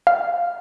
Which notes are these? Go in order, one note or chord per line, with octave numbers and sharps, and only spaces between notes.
F5